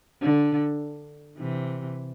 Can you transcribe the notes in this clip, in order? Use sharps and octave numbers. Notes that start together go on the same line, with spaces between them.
D3
C3 E3